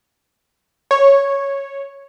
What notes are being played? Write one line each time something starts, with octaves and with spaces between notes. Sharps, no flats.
C#5